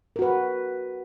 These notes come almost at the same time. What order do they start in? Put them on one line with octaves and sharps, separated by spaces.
A#4 F#4 B4